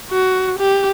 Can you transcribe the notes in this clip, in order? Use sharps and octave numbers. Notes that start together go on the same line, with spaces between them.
F#4
G4